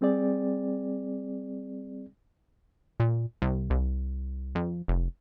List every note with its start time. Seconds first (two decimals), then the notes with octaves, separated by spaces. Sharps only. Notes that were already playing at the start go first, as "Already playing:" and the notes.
0.01 G3 C4 G#4 D5
3.00 A#2
3.42 C2
3.70 C2
4.55 F2
4.88 F1